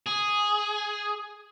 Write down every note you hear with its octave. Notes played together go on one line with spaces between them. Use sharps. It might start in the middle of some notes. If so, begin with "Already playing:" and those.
G#4